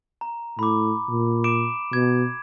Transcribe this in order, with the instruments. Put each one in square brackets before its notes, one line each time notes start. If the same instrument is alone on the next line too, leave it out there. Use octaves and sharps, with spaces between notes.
[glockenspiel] A#5
[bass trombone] A2 [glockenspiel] B5 D6
[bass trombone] A#2
[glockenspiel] D6 D7 E7
[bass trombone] B2 [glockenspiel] G#6